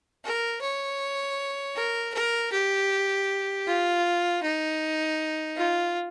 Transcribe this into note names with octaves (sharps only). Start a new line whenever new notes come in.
A#4
C#5
A#4
A#4
G4
F4
D#4
F4